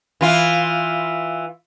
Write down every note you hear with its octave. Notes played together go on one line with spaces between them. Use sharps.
E3 F4